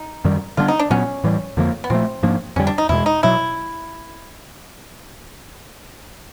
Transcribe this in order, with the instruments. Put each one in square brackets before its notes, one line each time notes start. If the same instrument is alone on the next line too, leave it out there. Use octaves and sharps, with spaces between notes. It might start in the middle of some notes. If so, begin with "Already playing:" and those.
Already playing: [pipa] D#4
[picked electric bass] F#2 D#3 G3
[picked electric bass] D3 G3 B3 D4 [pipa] F4
[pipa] D#4
D4
[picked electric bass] A#2 F#3 B3 [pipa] C#4
[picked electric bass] A2 E3 G3
F2 D3 F3 A#3
[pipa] B3
[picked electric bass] A#2 F3 A3 [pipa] C4
[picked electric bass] G#2 F3 A#3 D4
[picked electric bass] F2 D3 G3 [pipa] C#4
[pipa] D4
D#4
[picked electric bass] E2 B2 G#3 [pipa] E4
[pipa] D#4
[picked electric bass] B2 F#3 [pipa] E4